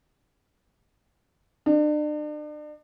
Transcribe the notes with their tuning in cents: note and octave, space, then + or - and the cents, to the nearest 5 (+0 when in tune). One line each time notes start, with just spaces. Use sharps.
D4 +40